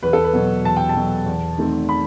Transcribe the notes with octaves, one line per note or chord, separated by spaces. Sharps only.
E2 B4
A4
B4
B2 F#3
E2 A5
G5
A5
B2 F#3
E2
D#3 A3 C4
B5